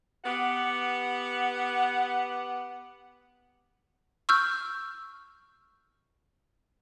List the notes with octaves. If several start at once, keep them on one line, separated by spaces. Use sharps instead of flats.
B3 G4 F#5
C#6 E6 F6 G6